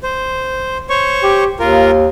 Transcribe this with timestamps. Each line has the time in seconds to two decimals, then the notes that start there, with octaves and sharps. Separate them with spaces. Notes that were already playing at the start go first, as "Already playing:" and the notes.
0.03 C5
0.90 C5 C#5 C#6
1.23 G4
1.60 D#2 F4 A#4